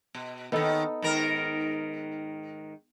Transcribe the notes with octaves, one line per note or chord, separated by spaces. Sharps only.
B2
D#2 D#3 B3 D#4 A4
G#2 D#3 A#4